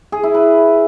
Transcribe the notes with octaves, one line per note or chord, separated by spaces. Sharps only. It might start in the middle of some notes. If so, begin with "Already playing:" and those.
G#4
E4
B4